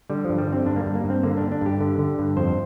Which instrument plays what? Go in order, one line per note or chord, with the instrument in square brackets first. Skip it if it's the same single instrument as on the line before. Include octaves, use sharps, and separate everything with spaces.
[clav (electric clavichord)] D3 G3
G2 F3
G3
D3
C4
G2 D4
A#3
G3
G2
A#3
G2
C4
D3 A#3
D3 D4
D4
G2 G4
D3
D3
G2
F2 C5